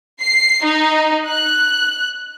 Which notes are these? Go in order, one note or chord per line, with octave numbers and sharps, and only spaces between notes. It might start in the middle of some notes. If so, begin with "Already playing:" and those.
C7
D#4
F#6